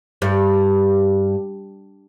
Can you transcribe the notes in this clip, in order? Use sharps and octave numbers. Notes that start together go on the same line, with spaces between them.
G2